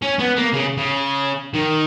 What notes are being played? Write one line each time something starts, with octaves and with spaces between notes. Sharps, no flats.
C#4
B3
A#3
C#3
C#3
D#3